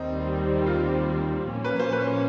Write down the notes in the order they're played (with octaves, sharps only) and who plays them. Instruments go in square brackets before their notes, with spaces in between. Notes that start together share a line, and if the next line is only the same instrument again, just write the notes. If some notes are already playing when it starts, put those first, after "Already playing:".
Already playing: [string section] D#2 D#3 G3 C4 [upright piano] D#4
[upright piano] F4
[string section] A#2 F3 A#3 C#4
[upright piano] B4
C5
B4